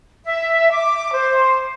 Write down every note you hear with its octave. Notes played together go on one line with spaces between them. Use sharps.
E5
D6
C5